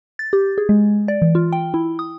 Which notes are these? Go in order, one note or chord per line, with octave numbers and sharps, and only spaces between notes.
A6
G4
G#4
G#3
D5
E3
F4
G5
E4
D#6